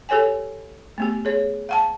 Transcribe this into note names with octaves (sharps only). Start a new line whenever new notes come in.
G4 A4 C#5 G5 G#5
A3 B3 G4
G#4 C#5
F5 F#5 A5